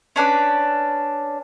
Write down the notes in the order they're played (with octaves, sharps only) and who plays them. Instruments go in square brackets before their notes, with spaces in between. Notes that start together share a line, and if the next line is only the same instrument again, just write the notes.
[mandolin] C#4 D4 B4 D6